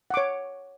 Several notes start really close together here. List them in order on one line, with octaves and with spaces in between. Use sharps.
F#5 D6 C#5